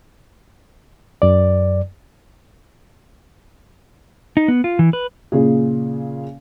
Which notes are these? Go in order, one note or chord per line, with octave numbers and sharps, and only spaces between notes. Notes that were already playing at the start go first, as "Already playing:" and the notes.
F#2 D5
D#4
B3
F4
E3
B4
A#2 C#3 G#4